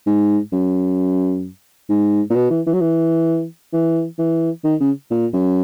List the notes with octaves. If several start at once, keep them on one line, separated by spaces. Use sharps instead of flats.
G#2
F#2
G#2
A#2
B2
E3
E3
F#3
E3
E3
E3
D#3
C#3
A#2
F#2